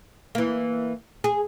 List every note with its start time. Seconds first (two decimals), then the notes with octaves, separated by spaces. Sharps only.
0.35 E3 A#3
1.24 G#4